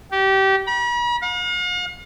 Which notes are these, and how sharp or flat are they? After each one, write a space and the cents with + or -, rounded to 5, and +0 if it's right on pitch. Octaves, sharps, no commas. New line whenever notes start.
G4 -25
B5 -45
F5 +45